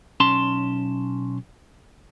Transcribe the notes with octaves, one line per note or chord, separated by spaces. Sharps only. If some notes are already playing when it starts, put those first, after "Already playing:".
B1 C#4 A5 C6